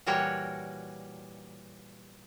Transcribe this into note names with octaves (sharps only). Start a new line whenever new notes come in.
A#2 E3 G3 F#4 A#4 C#5